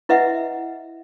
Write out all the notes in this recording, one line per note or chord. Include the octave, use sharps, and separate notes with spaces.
E4 B4 D#5 E5 F#5